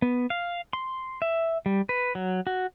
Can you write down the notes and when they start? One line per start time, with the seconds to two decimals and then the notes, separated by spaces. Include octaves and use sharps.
0.02 B3
0.30 F5
0.73 C6
1.22 E5
1.66 G3
1.89 B4
2.15 F#3
2.47 F#4